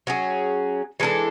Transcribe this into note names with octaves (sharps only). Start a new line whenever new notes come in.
F#3 C#4 G#4
E3 G#3 D4 A4